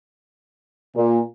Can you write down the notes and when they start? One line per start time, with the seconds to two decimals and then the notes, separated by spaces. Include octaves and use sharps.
0.95 A#2